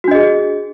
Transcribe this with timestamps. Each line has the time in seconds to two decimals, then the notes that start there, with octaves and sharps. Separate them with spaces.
0.04 F#4
0.08 D4
0.11 D#5
0.15 G#4